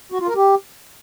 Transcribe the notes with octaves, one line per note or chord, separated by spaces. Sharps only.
F#4
F4
A#4
G4